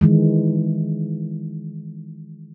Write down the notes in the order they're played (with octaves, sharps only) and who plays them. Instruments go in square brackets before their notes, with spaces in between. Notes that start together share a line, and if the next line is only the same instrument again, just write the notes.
[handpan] D#3 E3 G#3